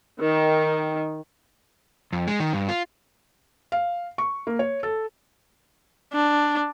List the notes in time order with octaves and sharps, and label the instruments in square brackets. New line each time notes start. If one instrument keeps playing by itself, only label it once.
[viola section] D#3
[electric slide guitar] F2
G#3
D#3
G2
F4
[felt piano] F5
C#6
A#3
C#5
A4
[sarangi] D4